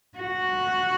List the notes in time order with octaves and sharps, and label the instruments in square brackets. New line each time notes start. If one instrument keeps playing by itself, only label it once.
[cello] F#4